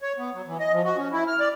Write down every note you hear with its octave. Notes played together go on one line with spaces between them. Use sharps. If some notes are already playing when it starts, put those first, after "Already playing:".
C#5
B3
F#3
E3
D#5
F3
F#4
C#4
E4
F6
D5